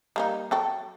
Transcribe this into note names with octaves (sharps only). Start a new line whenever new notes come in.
G3 A#3 D#4
F#3 A4 G5